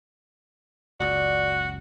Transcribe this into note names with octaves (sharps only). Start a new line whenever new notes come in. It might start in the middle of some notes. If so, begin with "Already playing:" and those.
F#1 C#2 F#4 D5